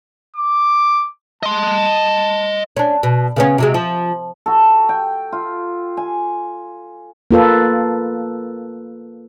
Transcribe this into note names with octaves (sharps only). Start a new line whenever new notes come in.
D6
D#5 A5 C6
C#4 D4
B2
C#3 B3 C#4
C3 F#3 G#3
F3
F#4 A4
G5
F4
G#5
A#3 F4 A4 B4